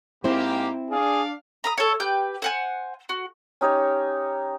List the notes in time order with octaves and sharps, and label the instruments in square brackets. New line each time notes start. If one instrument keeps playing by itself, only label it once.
[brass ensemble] G#2 A#3 G4 [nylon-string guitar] C4 E4 C5
[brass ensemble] D4 D5 F5 [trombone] G#4
[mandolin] A#5 B5 D#6
A4 C#5
G4 B4 G6
C5 F#5 G#5
F#4
[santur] C#4 D#4 G4 C#5